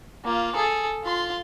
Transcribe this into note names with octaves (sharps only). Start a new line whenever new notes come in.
A#3 F4
G#4 A4
F4 C6